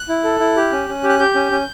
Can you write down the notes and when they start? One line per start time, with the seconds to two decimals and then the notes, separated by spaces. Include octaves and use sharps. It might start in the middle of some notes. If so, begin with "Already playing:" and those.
Already playing: F#6
0.09 E4
0.24 A4
0.40 E4
0.57 G4
0.72 C#4
0.89 C#4
1.04 G4
1.09 F#6
1.19 G4 G6
1.35 C#4
1.51 C#4